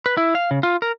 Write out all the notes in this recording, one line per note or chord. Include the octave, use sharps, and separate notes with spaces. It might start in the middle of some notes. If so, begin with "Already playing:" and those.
B4
E4
F5
C#3
F4
A#4